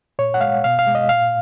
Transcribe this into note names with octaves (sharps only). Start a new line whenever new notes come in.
A#2 C#5
F#5
G#3 F5
B2 F5
F5
G#3
D#5
A#2 F5